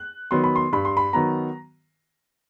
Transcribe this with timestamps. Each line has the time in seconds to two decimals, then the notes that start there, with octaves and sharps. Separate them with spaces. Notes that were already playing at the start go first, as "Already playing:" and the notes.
Already playing: F#6
0.31 D#3 F#3 B3 C6
0.44 B5
0.56 C6
0.72 G2 B5
0.85 C6
0.97 B5
1.13 D#3 F#3 B3 A#5